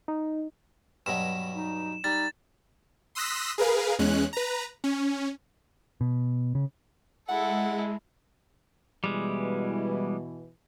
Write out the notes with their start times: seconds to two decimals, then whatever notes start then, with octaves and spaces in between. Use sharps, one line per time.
0.08 D#4
1.06 G2 B2 F#3 E7
1.54 D#4
2.04 G3 D#4 A6
3.15 C6 D#6 E6 F#6 A#6 B6
3.58 G#4 A#4 B4 F5
3.99 E2 G#3 C#4 F#6
4.33 B4 A#5
4.84 C#4
6.01 B2
6.55 C#3
7.29 G#3 E4 A4 F#5
9.04 B2 E3 G3 G#3